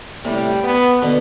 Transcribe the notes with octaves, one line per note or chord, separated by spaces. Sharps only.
A2 C3 G3
B3
B2 D3